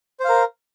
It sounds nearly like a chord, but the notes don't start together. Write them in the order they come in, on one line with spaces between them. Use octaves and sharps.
C5 F5 A#4